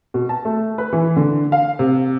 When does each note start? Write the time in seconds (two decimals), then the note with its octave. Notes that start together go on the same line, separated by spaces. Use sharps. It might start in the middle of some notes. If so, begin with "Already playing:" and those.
0.14 B2
0.29 A5
0.45 A3
0.78 B4
0.93 E3
1.16 D3
1.52 F5
1.79 C3